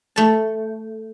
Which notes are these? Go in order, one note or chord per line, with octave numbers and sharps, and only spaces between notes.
A3 A5